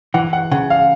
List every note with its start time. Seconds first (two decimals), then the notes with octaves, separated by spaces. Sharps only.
0.14 E3 F#5
0.33 F#5
0.52 C#3 F#5
0.70 F5